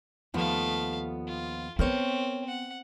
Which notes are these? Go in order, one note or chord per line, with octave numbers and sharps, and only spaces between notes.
D#2 F3 A3 B3 F5
F4
B3 C4 A#4 C5 C#5
F#5